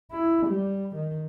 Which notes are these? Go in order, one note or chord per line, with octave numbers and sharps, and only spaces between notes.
E4
G3
D#3